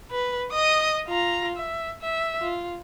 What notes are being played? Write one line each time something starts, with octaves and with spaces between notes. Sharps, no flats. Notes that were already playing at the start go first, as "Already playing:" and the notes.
B4
D#5 D#6
F4 A#5
E5
E5
F4